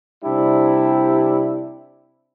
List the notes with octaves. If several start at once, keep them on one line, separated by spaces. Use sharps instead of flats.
C3 G3 D4 E4